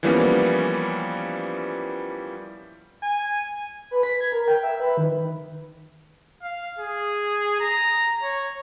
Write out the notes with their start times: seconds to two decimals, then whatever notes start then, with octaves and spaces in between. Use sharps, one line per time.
0.03 E3 F3 G3 A#3 B3 C#4
3.03 G#5
3.91 B4
4.03 B6
4.20 G#6
4.32 A#4
4.48 G5
4.63 E5
4.80 B4
4.97 D#3
6.42 F5
6.79 G#4
7.61 A#5
8.22 C#5